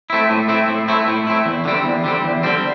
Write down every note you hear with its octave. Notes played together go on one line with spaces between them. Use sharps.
A3 C4 E4
A2
A3 C4 E4
A2
A3 C4 E4
A2
A3 C4 E4
E2
D3 G3 C4
E2
D3 G3 C4
E2
D3 G3 C4